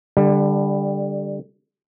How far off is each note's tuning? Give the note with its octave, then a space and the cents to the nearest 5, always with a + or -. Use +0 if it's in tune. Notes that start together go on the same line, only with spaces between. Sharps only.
D3 +0 G3 +20